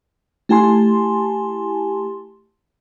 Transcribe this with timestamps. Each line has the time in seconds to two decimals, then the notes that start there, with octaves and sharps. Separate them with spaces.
0.49 A3 E4 G4 G#5 A5 C6